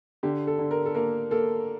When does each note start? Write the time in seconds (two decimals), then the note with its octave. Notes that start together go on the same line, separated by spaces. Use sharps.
0.23 D3 G4
0.47 A4
0.59 D3
0.71 A#4
0.86 A4
0.95 A#3 A#4
1.31 A#3 A4